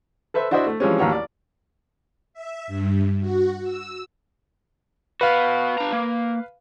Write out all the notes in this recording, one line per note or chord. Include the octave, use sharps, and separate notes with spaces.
A4 B4 C5 E5
D4 E4 F#4 C5 D#5 E5
A3
E3 F3 G3 G#3 C4 C#4
A1 D#2 A#3 F#4 G4 C#5
D5
E5
G2
F#4
E6
B3 F#4 B4 F5
D4 A#5
A#3